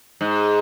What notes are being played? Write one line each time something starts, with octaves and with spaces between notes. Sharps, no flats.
G#2